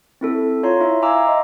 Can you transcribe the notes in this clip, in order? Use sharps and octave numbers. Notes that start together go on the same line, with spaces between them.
C4 E4 A4
F4 C#5 A#5 C6
E4 E5
E5 F5 G#5 A#5 D6 E6
D#5 C6